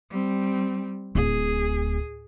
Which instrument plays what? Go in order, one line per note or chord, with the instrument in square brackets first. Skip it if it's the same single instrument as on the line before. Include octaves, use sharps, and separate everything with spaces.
[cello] G3 C4
[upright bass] D1 [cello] G#4